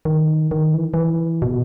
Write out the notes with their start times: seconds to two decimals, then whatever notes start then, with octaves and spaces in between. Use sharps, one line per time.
0.05 D#3
0.51 D#3
0.74 E3
0.94 E3
1.42 B2